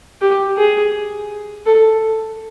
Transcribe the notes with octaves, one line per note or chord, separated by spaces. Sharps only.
G4
G#4
A4